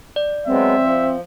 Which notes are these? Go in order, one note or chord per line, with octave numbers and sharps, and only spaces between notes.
D5
F#3 G#3 B3 C4 E5
F3